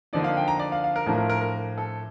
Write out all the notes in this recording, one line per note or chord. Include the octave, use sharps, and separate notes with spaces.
D3 F3 A#3 D#4 D5
F5
G5
A#5
D5
F5
F5
A#4
A2 F3 A3 D4 F4 A#4
A#4
A#4
A#4
A4